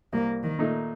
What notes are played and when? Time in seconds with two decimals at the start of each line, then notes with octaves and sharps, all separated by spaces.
0.13 C2 A#3
0.43 D#3
0.59 A#2 A3 D#4